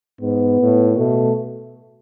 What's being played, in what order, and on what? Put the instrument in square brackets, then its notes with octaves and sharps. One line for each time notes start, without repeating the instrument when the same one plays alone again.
[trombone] G#2 [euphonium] B3
[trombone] A2
[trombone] B2 [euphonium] A3